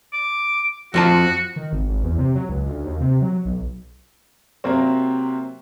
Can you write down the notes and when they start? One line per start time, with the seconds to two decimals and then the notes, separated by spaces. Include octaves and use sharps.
0.13 D6
0.94 F2 F3 F#4 A5
1.56 D#3
1.73 G#1
1.89 G#1
2.04 E2
2.18 C3
2.35 F#3
2.49 C#2
2.69 D2
2.85 D#2
3.01 C3
3.22 F#3
3.45 B1
4.64 C3 F#3 A#3 C4